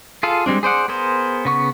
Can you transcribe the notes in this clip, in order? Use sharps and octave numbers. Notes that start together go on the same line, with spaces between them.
F4 G#4 A4 F5
G3 G#3 C4 D4
G#4 C5 D5 F#5
B3 G#4 A#4 C5
C#3 B3 C#6